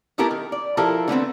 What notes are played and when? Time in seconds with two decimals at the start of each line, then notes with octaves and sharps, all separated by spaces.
0.18 A3 B3 E4 G4 A4 A#4
0.31 D#3
0.52 D5
0.77 F3 E4 G4 A4 A#4 C5
1.08 D3 A3 B3 C4